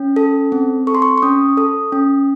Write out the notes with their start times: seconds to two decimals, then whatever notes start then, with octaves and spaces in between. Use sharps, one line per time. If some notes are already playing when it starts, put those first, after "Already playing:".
Already playing: C#4
0.16 A4
0.52 C4
0.87 A4 C#6
0.95 C6
1.02 C#6
1.18 C#6
1.22 C#4 D#6
1.57 A4 D#6
1.92 C#4